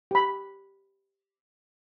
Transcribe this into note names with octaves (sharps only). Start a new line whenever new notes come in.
G4 B5